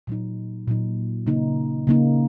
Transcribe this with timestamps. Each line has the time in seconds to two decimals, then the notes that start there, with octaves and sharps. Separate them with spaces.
0.07 A#2 F#3 D#4
0.68 A#2 F#3 D#4
1.27 C#3 A#3 D#4
1.87 C#3 A#3 D#4